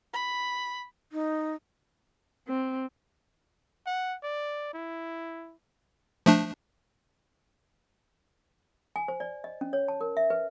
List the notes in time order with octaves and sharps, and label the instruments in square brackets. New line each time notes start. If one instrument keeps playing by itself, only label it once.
[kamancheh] B5
[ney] D#4
[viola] C4
[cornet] F#5
D5
E4
[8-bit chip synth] F3 A3 D4
[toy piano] G#5
C5
D5
D#5
C#4
C#5
A5
A#4
E5
B4